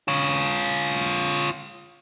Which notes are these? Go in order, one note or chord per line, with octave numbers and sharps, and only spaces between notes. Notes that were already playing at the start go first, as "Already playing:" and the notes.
F4 C#5